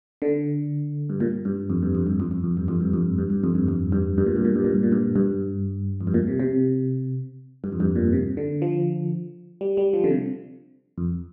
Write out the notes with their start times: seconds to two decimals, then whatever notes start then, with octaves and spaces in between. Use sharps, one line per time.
0.22 D3
1.10 G2
1.20 A#2
1.45 G2
1.70 F2
1.82 G2
1.95 F2
2.07 G2
2.20 F2
2.31 F2
2.44 F2
2.57 G2
2.68 F2
2.80 G2
2.93 F2
3.18 G2
3.30 G2
3.44 F2
3.55 G2
3.68 F2
3.92 G2
4.18 G2
4.26 A#2
4.36 G2
4.45 A#2
4.56 G2
4.64 A#2
4.74 G2
4.83 A#2
4.92 G2
5.16 G2
6.01 F2
6.07 G2
6.14 A#2
6.27 C3
6.40 C3
7.64 G2
7.72 F2
7.80 G2
7.96 A#2
8.13 C3
8.37 D3
8.62 F3
9.61 G3
9.77 G3
9.93 F3
10.04 D3
10.11 C3
10.98 F2